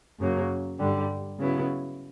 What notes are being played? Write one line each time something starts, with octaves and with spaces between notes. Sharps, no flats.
F#2 C#3 F#3 A#3
G2 D3 G3
C#3 F#3 B3 E4